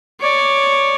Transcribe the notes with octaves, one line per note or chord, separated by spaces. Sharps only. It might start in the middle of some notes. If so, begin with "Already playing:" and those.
C#5 D5